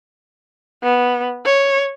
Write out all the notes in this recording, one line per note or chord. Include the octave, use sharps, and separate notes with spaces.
B3
C#5